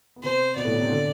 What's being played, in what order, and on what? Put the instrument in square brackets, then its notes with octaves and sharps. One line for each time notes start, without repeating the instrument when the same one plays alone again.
[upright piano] B3
[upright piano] C3 C4 [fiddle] C5
[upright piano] B2 B3 [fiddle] D5
[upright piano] A2 A3
B2 B3
C3 C4
D3 D4